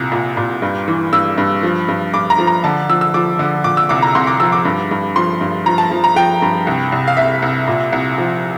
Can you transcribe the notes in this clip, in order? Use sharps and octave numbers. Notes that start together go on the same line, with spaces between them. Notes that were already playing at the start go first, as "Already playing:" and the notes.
Already playing: C2 A#2
A#2
A#2
G2
E3
G2 E6
G2
F3
G2
G2 D6
A#5
F3
A#5
D3 A5
F3 E6
E6
F3 D6
D3
A#2 D6
E6
C2 D6
A#5
C2 C6
D6
F3 E6
D6
G2
G2
F3 C6
G2
F3 A#5
A5
F3
A#5
F3 G5
G2
C2
C2
F5
C2 E5
C2
A#2
C2
F3